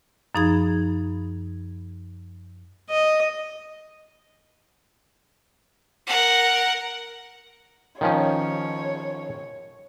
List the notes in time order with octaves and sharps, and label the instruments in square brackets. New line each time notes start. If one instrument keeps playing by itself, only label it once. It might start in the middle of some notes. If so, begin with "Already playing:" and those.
[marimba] F#2 F3 D#4 G#4 B5 G#6
[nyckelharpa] D#5
[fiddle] A#4 F#5
[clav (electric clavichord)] D#3 F3 C#4 [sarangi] C#5